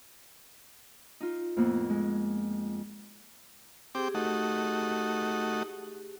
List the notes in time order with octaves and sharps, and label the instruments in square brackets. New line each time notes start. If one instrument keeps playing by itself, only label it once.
[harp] D#4 F4
F2 A2 A#3 B3
G#3
[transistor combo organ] C4 G5 D6 [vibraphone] G4 G#4
[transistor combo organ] A3 D#4 F#4